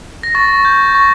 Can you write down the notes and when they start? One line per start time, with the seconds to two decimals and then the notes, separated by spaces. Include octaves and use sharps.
0.23 A#6
0.35 C#6 A6
0.65 G6
0.95 C#6